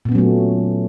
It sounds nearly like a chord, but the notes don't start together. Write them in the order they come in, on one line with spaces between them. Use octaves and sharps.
A#2 B3 C#4 F#3 A3